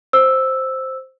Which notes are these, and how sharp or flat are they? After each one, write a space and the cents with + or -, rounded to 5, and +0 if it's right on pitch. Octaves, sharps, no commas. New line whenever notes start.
C5 +0 E6 +0